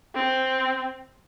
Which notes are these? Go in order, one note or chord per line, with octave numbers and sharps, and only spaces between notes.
C4